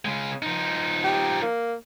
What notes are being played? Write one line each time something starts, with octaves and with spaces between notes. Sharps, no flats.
C#3 G#3
F3 D#4
G4
A#3